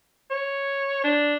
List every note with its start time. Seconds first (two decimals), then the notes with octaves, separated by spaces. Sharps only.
0.30 C#5
1.04 D4